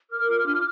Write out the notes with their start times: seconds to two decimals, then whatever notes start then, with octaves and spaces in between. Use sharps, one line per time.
0.10 A#4 D6 F6
0.28 F4
0.46 D4